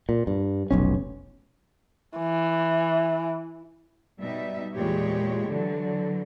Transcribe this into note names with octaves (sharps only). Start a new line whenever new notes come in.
A#2
G2
F1 B1 C#4
E3
B2 G3 D#4 E5
E2 A#2 E3 G#3 G4 C#5
D3 E3 F#3